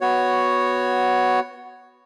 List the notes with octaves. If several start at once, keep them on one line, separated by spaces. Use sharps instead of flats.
B3 F#4 C#5